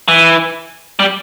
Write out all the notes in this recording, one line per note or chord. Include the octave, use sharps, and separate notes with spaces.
E3
G3